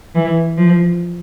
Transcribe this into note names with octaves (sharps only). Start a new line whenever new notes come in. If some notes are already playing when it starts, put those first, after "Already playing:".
E3
F3